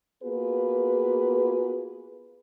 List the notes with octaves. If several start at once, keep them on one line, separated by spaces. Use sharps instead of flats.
A#3 B3 F4 F#4 G#4 B4